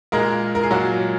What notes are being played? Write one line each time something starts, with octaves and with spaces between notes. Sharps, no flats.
A#2 G#3 A#3 A#4
A#4
G#4
A#2 F#3 G#3 F#4